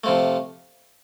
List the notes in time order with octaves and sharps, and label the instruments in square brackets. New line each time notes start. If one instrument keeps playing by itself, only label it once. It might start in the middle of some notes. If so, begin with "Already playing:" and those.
[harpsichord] C3 F3 A3